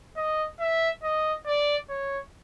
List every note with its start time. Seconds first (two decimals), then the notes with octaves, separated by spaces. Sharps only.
0.17 D#5
0.60 E5
1.04 D#5
1.46 D5
1.89 C#5